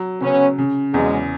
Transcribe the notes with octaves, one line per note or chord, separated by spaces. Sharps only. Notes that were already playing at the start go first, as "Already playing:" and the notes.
Already playing: F#3
C#3 B3 C#4
C#3
E2 F#3 G#3